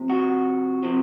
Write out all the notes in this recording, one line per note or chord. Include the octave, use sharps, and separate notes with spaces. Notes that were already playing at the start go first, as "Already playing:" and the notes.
Already playing: C3 F3
F#4
C3 F3